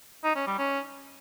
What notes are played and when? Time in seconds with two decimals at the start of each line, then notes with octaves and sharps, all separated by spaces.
0.24 D#4
0.36 C#4
0.47 G3
0.59 C#4